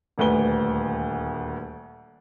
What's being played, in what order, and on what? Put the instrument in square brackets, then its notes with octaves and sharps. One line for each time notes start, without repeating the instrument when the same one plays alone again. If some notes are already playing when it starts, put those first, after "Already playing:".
[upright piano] D#1 D2 B4 G7